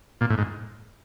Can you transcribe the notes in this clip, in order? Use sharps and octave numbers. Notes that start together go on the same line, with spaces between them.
A#2
A2
G#2